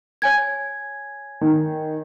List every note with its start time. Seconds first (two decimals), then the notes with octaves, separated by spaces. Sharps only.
0.22 C#5 G#5 G#6
1.41 D#3